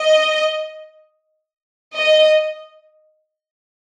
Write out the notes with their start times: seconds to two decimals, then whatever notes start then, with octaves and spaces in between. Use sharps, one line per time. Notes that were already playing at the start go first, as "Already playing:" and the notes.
Already playing: D#5
1.94 D#5